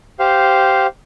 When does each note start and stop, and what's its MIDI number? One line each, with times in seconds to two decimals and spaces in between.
0.19 0.86 67
0.19 0.86 72
0.19 0.86 77